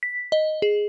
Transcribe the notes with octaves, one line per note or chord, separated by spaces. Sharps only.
B6
D#5
G#4